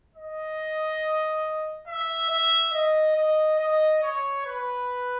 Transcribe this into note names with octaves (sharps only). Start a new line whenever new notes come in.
D#5
E5
E5
D#5
D#5
D#5
C#5
B4